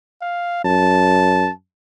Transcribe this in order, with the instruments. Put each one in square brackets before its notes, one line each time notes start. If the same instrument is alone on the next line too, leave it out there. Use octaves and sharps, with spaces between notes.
[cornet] F5
[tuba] F#2 [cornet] A5